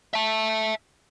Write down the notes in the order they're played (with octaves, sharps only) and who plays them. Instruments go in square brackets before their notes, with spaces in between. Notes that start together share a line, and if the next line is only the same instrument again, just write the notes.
[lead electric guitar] E5 A5